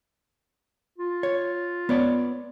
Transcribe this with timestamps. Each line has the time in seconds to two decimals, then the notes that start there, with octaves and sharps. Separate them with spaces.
0.98 F4
1.23 C#5
1.89 B3 C#5 D5